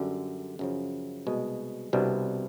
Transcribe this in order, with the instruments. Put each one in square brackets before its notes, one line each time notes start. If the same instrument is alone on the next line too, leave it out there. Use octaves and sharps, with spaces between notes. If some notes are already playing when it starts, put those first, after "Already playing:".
Already playing: [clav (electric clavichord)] F#2 D3 G3
F#2 C#3 F3
C2 B2 G#3
C2 B2 G3 B3 D4